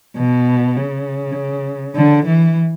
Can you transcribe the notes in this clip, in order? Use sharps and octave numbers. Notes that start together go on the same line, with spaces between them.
B2
C#3
D3
E3